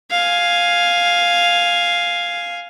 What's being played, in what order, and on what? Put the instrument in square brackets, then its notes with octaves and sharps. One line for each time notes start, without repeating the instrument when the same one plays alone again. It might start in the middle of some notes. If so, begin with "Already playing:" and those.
[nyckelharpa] F5 G#5